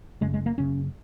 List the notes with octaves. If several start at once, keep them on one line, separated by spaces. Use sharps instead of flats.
F#1 F#2 C#3 G#3
G#3
A#3
F#1 F#2 C#3 C#4